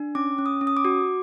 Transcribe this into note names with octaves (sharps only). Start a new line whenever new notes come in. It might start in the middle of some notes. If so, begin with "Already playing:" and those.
Already playing: D4
C#4 D6
C#4
D#6
C#4
D#6
D6
F#4